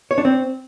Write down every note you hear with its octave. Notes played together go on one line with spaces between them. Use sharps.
C#5
D4
C4